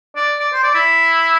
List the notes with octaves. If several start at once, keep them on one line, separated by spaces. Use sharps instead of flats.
D5
D5
C5
D5
E4